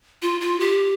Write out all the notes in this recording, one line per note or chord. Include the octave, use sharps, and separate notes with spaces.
F4
F4
G4